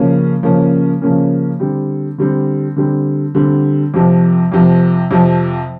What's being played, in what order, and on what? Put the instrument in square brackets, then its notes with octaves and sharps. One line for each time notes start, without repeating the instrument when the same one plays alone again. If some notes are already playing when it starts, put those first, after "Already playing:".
Already playing: [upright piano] C#3 F3 A#3 C#4
C#3 F3 A#3 C#4
C#3 F3 A#3 C#4
D3 G3 C4
D3 G3 C4
D3 G3 C4
D3 G3 C4
F2 C3 F3
F2 C3 F3
F2 C3 F3